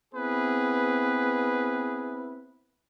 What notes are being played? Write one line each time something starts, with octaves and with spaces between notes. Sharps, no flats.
B3 C4 E4 G#4 B4